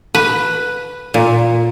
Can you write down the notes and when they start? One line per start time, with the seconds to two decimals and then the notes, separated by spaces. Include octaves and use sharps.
0.15 B4
1.14 A#2